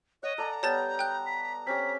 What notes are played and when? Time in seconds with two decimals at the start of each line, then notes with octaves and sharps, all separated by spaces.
0.23 C#5 D#5 F#5
0.38 A4 D5 G#5 A#5
0.63 G3 B3 C#5 A5 G6 A6
0.99 G5 F#6
1.26 B6
1.67 C4 C#4 G4 B6